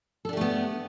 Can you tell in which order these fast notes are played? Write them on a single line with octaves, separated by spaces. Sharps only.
A4 D4 G4 A3 B3